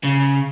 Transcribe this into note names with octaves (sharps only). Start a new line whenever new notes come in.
C#3